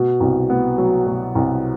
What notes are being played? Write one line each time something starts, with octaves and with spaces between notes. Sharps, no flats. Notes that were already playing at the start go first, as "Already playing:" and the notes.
Already playing: B2
C2
B3
F#3
B2
C2